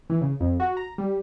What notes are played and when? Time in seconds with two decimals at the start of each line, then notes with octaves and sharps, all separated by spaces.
0.10 E3
0.21 C#3
0.40 F2
0.60 F#4
0.77 A#5
0.98 G3